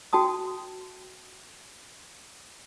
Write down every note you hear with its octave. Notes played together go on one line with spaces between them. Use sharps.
F#4 G5 A5 D#6